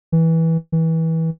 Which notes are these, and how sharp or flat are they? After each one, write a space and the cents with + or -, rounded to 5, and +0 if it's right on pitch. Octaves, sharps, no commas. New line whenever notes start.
E3 -15
E3 -25